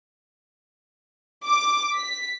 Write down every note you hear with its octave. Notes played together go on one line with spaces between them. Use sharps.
D6
B6